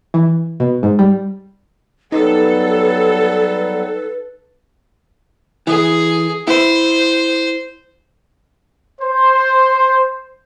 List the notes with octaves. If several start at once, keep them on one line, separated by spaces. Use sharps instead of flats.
E3
B2
G#2
G3
F#3 G3 B3 D#4 A4 B4
E3 G#4
E4 C5
C5